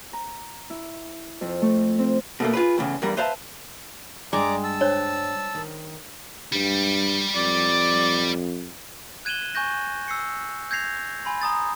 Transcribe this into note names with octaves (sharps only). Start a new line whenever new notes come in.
A#5
E4
F2
A3
C4
B2 A3 A#3
F4 G#4 B4
E2 A2 C#3
E2 G2 G3 A#4
B4 C5 E5 F5 A5
G2 G#3 D5 A#5 D6
A5 E6
D4 C5 C#5
D#3
G2 G3
F2 D5
F#6 G#6 D#7 E7 F#7 G7
G#5 C#6 G6 A#6
E6 C7 C#7
G6 G#6 A#6 C7 F7
G#5 B5 C6
A#5 D#6 A6